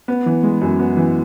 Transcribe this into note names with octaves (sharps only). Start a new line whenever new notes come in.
B3
E3
G#3
F#2
B3
E3